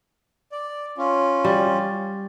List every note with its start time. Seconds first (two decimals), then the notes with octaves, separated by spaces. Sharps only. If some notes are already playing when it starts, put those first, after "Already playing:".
0.52 D5
0.98 C#4 F4
1.44 G3